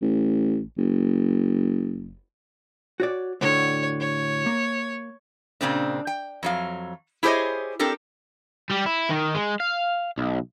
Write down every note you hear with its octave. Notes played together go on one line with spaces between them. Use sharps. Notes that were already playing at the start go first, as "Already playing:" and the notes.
A1
F#1
F#4 C#5 D5
D2 A2 D3 C#5
C#5
A#3
A#2 C#3 C4 D4
G5
F2 F#3 F5
E4 G4 G#4 C5 C#5 D#5
C4 D4 G4 A4 A#4
G3 G4
E4
D#3
G#3
F5
B1